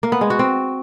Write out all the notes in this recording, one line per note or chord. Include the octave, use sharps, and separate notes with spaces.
A#3
B3
G#3
F#4
C4